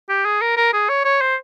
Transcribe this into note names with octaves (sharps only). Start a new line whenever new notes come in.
G4
G#4
A#4
A#4
G#4
C#5
C#5
C5